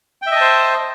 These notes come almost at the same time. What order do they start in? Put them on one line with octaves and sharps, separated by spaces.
G5 E5 D#5 A5 C5